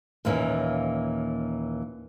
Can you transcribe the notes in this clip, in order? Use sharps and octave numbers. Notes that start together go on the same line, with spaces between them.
D#2 A#2 E3 A#3 C#4